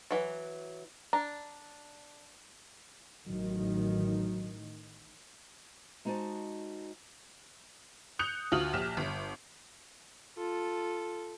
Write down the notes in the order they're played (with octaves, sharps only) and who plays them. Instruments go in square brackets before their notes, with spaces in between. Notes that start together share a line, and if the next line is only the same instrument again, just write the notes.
[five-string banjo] E3 F#3
[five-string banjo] D4 [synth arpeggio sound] A#5
[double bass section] A1 D#3 [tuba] F#3
[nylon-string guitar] G#3 D#4 F#4 C5 D5 A5
[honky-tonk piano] D#6 F#6 G6 C#7 F7
D2 F4 F#4 D#6 F6 F#7
A#1 G4 F6 E7
G1
[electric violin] F4 [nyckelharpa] A4